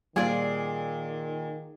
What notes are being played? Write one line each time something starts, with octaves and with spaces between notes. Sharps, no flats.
A#2 D#3 G3 F4 G#4 D5